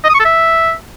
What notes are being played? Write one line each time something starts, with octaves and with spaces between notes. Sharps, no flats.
D#5
D#6
C#6
A4
E5